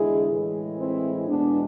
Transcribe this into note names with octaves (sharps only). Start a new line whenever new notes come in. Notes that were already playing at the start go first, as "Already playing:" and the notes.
Already playing: E2 D3 G#3 E4 G#4
A2 E3 G#3
C4 E4
E2 B2 G#3 B3 D4